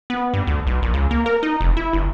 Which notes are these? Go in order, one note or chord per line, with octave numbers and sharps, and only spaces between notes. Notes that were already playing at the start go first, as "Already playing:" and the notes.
B3
G2
D2
B1
A#1
C#2
A#3
A#4
D#4
F1
E4
G1